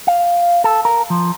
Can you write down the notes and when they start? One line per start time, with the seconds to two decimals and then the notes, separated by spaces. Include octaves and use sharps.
0.07 F5
0.64 A4
0.85 A#4
1.10 F3